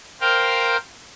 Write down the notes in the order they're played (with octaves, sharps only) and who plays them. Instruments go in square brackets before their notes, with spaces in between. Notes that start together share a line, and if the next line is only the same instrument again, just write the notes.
[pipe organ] A#4 C5 F5 G5